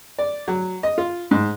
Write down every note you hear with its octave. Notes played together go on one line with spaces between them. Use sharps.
D5
F#3
D#5
F4
G#2